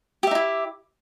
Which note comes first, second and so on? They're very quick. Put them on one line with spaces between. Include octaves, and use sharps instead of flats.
G4 E5 D#4 E4